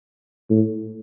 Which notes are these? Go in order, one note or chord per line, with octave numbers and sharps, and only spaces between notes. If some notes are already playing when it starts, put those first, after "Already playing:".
A2